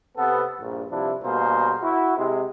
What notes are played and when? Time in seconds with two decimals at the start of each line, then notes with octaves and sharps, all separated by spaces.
0.17 C3 B3 A4
0.60 A#1 G2
0.90 G2 C3 F3 D4 E4
1.23 G2 B2 A#3 G#4 A#4 C5
1.81 E4 F#4
2.17 C3 G#3